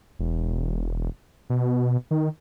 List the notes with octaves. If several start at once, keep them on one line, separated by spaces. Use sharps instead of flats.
E1
B2
D#3